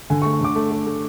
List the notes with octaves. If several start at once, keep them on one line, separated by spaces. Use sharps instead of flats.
D3 G#5
C#6
A3
C#6
D3 D6
A3
A3
A3